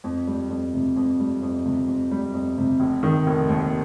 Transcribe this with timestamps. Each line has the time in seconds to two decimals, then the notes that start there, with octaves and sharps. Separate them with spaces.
0.04 F2
0.27 G3
0.50 F2
0.74 C3
0.96 F2
1.20 G3
1.42 F2
1.66 C3
1.88 F2
2.12 G3
2.34 F2
2.58 C3
2.80 F1
3.03 D#3
3.27 F1
3.49 D#2